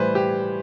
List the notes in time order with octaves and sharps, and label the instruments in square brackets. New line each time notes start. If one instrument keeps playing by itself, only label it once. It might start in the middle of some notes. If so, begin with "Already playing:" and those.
Already playing: [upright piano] A2 E3 G3 B4 C5
G4